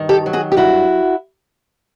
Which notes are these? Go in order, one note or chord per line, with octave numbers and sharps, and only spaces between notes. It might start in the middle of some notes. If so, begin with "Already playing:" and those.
Already playing: G2 D#3
G4 A4
F#3
F#4 G#4
G4
G2 E4 F#4